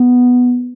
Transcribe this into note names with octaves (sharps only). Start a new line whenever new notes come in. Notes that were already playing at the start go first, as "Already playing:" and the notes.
Already playing: B3